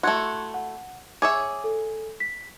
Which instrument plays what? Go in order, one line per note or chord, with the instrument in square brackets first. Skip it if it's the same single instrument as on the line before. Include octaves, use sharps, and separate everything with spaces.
[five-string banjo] A3 E4 F#4 [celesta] C6 F#6 G#6
[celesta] F#5
[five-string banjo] G#4 C#5 E5 [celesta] D6 G#6
[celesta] A4
B6